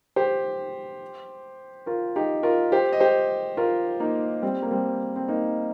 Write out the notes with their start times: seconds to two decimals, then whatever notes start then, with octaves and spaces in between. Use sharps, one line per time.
0.16 G4 C5
1.86 F4 A#4
2.16 D#4 G4
2.43 F4 A#4
2.72 G4 C5
2.93 D#5
3.00 G4 C5
3.57 F4 A#4
4.00 A#3 D#4
4.42 G3 C4
4.62 A#3
4.71 G3 C4
5.16 C4
5.28 A#3 D#4